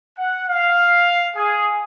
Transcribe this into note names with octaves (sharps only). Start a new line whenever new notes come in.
F#5
F5
G#4